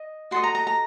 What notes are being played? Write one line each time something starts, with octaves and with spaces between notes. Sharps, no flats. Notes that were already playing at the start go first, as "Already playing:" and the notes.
Already playing: D#5
F#4 A4 D#5 C6
A#5
A#5
A#5